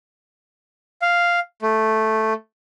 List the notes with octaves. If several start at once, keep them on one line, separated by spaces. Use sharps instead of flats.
F5
A3